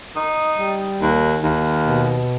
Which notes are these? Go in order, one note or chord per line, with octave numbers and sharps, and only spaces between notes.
D#4
G3
D#2
D#2
B2